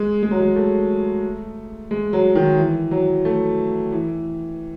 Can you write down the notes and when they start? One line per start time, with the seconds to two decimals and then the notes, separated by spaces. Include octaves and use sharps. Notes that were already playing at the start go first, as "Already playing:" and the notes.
Already playing: G#3
0.23 G#3
0.31 F#3
0.40 G#3
0.56 A3
1.91 G#3
2.13 F#3
2.35 D#3
2.58 E3
2.91 F#3
3.25 A3
3.92 E3